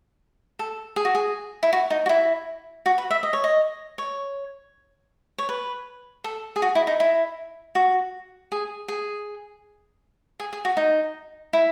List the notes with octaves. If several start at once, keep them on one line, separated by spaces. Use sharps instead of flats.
A4
G#4
F#4
G#4
E4
F#4
D#4
F#4
E4
F#4
B4
E5
D#5
C#5
D#5
C#5
C#5
B4
A4
G#4
F#4
E4
D#4
E4
F#4
G#4
G#4
G#4
G#4
F#4
D#4
E4